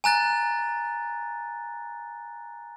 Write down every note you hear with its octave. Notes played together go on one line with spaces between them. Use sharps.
G#5 A#5 F#6 A6